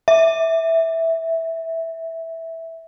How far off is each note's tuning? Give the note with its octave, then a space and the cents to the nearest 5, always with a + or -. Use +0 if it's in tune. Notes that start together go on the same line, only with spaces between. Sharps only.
E5 -10